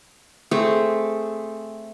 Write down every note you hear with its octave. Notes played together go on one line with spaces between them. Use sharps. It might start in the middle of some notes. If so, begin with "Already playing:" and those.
A3 C4 G#4